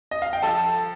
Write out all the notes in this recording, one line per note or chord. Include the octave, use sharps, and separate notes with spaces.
D#5
F5
G5
F3 A4 A5